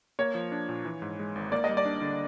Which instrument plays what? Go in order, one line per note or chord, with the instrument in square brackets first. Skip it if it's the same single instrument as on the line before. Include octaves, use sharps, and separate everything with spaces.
[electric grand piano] A#3 [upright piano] C#5
[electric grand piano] F3
D4
A#2
E3
G#2
G#3
G#1
[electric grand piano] A#3 [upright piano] D5
[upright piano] D#5
[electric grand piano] G3
[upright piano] D5
[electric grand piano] D4
D3